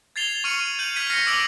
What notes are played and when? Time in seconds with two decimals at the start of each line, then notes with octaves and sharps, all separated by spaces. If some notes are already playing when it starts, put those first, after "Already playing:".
0.16 G#6 A6 C7 F7 G7
0.44 C#6 F6 C#7 D#7 F#7
0.79 G6 D#7 F7 F#7
0.96 F6 G6 G#6 B6 D#7
1.10 F6 A#6 C7 C#7
1.27 D6 E6 A#6 D7 F7 F#7